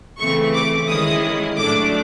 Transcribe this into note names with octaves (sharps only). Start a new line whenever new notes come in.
C#3 E3 A3 C4 C#6
D6
D#3 G#3 C#4 E4 D#6
A2 F#3 A3 D4 D6